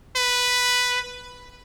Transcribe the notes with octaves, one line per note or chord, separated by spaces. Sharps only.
B4